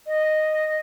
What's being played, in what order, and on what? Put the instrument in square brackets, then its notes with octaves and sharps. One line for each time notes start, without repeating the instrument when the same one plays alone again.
[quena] D#5